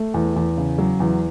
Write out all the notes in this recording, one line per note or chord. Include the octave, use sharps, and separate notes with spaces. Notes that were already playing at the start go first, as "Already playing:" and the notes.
Already playing: A3
E2
E2
C#3
F#3
E2